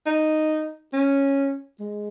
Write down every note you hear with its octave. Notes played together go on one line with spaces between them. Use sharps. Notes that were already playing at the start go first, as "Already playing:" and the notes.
D#4
C#4
G#3